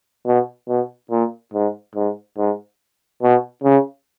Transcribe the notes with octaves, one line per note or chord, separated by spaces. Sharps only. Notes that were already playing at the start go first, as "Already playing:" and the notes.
B2
B2
A#2
G#2
G#2
G#2
B2
C#3